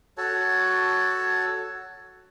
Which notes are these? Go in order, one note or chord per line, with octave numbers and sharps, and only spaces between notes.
F#4 A4 C#5 A5